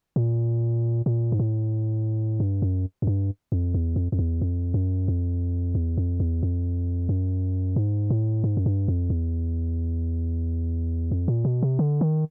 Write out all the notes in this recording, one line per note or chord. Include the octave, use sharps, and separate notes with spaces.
A#2
A#2
G#2
A2
G2
F#2
F#2
G2
F2
E2
F2
F2
E2
F2
F#2
F2
E2
F2
E2
F2
F#2
G#2
A2
G#2
F#2
G2
F2
E2
F2
A#2
B2
C3
D3
D#3